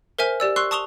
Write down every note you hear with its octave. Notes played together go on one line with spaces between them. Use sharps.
A#4 C5 E5 G#5 F6
G4 D5 E6
C6 C#6 E6 F#6 C7
A5 C#6 D#6 E7 F7 G7